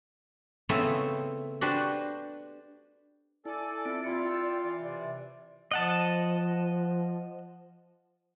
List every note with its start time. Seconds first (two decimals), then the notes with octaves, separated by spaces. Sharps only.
0.69 C#3 A3 B3 C4 E4 C5
1.61 D4 F#4 G4 B4 C5
3.45 E4 A4 D5 G#5 A6
3.85 C4 E4 F4 D7
4.04 A#2 G3 E4 F4 D5 C#7
4.25 G5 E6
4.64 E3 D5
4.82 C3 D5
5.71 F3 D#5 F#5 A5